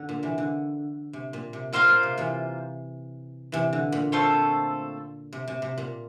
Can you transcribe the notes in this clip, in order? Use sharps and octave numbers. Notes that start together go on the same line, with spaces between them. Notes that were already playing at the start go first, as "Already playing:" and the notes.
Already playing: D3
A#2
C3 E3
D3
C3
A#2
C3
A#2 A#3 F4 C5 F5
A#2
C3
C3 E3
C3 E3
D3
A#2
A3 C4 F4 A4
C3
C3
C3
A#2